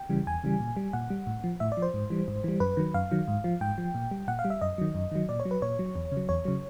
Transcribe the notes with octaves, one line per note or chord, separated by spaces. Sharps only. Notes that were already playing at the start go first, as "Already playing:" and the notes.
Already playing: G5
C#3 E3 G3
E2 G#5
C#3 E3 G3
A#2
G3
A#2 F#5
G3
A2
F3
A2 E5
D5
F3
C5
G#2
E3 G3
G#2
E3 G3
F#2 B4
D#3 F#3
F#2 F5
D#3 F#3
G#2
F3
G#2 G5
F3
A#2
G3
A#2 F#5
F5
G3
E5
F#2 D#5
D#3 F#3
F#2
D#3 F#3
A#2 D5
C#5
F#3
B4
A#2 C#5
F#3
E2
C#3
F#3
E2 C#5
C#3 F#3